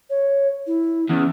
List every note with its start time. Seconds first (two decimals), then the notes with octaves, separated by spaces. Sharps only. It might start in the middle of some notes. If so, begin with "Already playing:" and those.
0.10 C#5
0.67 E4
1.09 E2 C#4